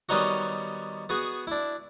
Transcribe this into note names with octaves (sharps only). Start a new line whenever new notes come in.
D#3 G3 B3 C#4 D#4 F#4
B3 F#4 G#4
D4 E4